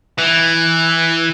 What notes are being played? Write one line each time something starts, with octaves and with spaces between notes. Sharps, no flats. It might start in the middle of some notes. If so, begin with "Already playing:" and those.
E3